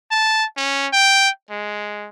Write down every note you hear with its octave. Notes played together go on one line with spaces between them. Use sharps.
A5
C#4
G5
G#3